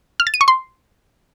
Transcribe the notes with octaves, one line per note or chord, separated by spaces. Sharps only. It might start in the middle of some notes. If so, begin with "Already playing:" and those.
F6
A6
D#7
C#6
C6